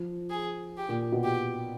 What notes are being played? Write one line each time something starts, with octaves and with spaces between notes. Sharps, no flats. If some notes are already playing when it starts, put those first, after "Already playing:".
Already playing: F3
G#4
G4
A#2
B2
G4